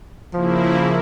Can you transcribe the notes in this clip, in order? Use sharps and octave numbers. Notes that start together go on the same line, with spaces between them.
C#3 F3 A#3 E4